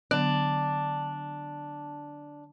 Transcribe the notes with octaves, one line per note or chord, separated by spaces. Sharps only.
D3 F#3 B3 D4